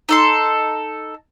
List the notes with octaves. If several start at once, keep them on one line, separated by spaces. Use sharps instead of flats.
D#4 A4 C6